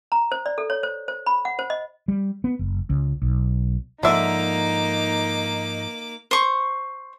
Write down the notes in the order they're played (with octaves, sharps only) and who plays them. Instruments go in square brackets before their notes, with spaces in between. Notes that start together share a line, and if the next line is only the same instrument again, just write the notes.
[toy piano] A#5
C5
D5
A4
C#5
C5
C5
B5
F#5
C5
D#5
[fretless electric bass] G3
B3
F#1
C#2
B1
[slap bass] G#2 F3 [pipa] D3 E5 [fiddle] A#3 D6 [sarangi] D#4
[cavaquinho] C5 C#6